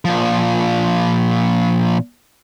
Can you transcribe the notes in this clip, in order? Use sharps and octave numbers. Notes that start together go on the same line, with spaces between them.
A#2 F3